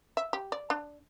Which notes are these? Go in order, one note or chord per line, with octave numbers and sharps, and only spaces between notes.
E5
G4
D5
D4